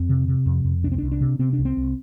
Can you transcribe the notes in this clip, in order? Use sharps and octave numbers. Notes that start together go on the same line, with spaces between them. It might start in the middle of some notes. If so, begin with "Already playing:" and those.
Already playing: F2 C4
C3
C3
F2
F2
C2 D4
C4
C2 D4
D4
C3
C3 C4
D4
C2
C4
C2